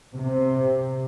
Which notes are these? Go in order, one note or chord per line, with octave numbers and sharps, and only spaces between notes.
C3